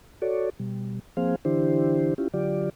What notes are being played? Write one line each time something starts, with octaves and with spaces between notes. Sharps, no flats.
F#4 A4 C#5 D5
B2 G3
F3 A#3 C4 G#4 C5 F5
D3 E3 D4 E4 G4 C5
C#4 E4 F4 G4
D3 F#3 F4 G4 D5